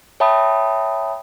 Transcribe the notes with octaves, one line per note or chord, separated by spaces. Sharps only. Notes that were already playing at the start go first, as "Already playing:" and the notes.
C#5 E5 G5 A5 B5 D#6